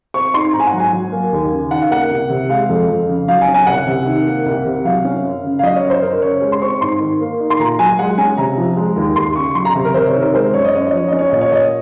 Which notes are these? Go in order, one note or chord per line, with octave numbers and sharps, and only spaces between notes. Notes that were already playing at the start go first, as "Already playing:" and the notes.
C4 C#6
D#4 C6
G#2 A#5
G#5
F#5
F#3
G#5
F#3
A#3
D#2
C#3
D#3 F#5
F5
A#3 F#5
C2
C3
G#3 F5
F2
F2
C#3
F#3 F5
G#5
C#4
G#5
C2 F#5
C3
D#3
A#3
C2
C3
F#3 F5
C#4
F#2
C#3
F5
F#3 D#5
C#5
F#2
C5
F#2 A#4
C#3 C#5
G#3
C6
C4 C#6
G#2 C6
D#3
A#3
D#4
C6
A#2 A#5
F#3 G#5
G#3 F#5
C#4 G#5
C3 A#5
F3
G#3
D#2
D#2 C6
C#3 C#6
F#3 C6
A#5
C3
A#4
C3 C5
C#5
D#3
A#4
G#3 C5
F#2 C#5
D#5
F#2 C#5
D#5
F3 C#5
C#4 D#5
C#5
A#2 D#5
C#5
A#2 D#5